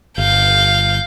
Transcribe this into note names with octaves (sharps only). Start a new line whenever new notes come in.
G1 F5 G6